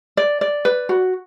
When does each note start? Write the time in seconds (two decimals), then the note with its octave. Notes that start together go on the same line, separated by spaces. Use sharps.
0.17 D5
0.41 D5
0.65 B4
0.89 F#4